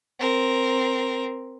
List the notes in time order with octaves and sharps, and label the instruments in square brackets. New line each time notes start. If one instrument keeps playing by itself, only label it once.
[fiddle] C4 A#4